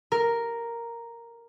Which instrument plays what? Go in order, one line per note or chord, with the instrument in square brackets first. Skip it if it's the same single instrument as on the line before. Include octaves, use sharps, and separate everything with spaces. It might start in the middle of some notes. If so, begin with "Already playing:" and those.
[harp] A#4